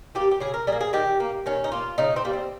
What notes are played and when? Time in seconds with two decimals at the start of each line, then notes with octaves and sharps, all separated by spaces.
0.15 G3 A#3 G4
0.31 G4
0.40 C#3 G#4
0.54 A#4
0.67 G3 G#4
0.72 A#3
0.81 G#4
0.93 D#3 G4
1.20 A#3
1.46 D#3 C#4
1.64 D#4
1.72 A#3 F4
1.98 C#3 D#4
2.16 C4
2.24 G3 A#3
2.33 C4